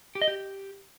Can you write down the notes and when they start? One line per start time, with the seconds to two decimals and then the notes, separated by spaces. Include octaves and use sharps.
0.15 G4
0.22 D#5
0.28 G4